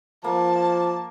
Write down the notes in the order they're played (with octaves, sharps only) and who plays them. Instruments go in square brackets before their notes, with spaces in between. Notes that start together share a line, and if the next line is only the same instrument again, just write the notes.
[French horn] F3 [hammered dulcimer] A#3 [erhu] A5